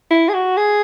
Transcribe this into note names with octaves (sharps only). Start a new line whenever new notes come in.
E4
G#4
F#4
G#4